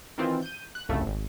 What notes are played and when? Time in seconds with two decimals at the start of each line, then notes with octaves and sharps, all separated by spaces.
0.18 D#3 E3 C4 F4
0.42 G6 D#7
0.75 F#6
0.89 G1 C2 F2 C#3 A3
1.06 G#1